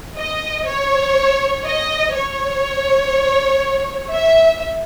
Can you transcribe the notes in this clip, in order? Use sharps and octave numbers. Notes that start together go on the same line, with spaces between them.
D#5
C#5
D#5
C#5
E5